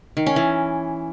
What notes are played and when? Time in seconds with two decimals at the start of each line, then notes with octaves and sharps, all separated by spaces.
0.17 D#3
0.26 C#4
0.36 E3